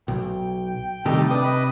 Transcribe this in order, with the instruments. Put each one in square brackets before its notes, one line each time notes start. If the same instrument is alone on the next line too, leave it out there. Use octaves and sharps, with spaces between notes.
[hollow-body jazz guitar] B1 [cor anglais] G5
[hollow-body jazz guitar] C3 G4 [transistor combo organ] D#3 G3 A3
[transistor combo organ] D4 D#6 [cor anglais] B4
[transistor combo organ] B4 D#5 [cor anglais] G5